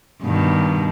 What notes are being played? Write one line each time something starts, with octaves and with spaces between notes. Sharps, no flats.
G2 B2 D#3